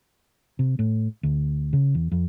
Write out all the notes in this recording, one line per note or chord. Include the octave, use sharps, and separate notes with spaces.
C3
A2
D2
C#3
E2
F2